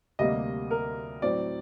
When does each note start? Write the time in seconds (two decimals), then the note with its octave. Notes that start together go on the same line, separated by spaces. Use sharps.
0.19 D2 C3 G3 A#3 D#5
0.71 A#4
1.22 A2 F#3 C4 D5